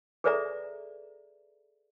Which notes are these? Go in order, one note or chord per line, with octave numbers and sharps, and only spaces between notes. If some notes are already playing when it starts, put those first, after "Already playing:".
G#4 A4 B4 D5 E5 A#5